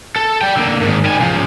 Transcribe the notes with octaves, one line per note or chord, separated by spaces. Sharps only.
A4
G3 G5
D3 A#3
G#2 D#3
G3 G#5
C#3 F3